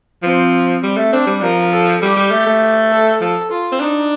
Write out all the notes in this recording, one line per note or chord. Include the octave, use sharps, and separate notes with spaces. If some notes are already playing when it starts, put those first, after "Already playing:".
F3 C4
G3
A3
C4 D4
G3
F3 A#4
A4
G3 G4
G3
A3
A3
A4
F3 A4
F4
C4
D4 D#4